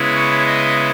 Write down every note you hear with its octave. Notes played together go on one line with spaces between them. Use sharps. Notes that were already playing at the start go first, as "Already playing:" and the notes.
Already playing: C#3 G#3 B3 E4
C#5
D#5